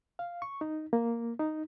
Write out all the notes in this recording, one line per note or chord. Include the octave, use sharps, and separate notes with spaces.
F5
C#6
D#4
A#3
D#4